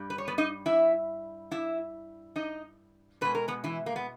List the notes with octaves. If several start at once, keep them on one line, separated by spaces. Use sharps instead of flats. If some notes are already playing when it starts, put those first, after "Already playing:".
Already playing: G2 G3
B4
C#5
B3 B4
D#4 D#5
E4 E5
E4 E5
D#4 D#5
B2 G#3 B4
A#4
B3 B4
E3 E4
A#3
B3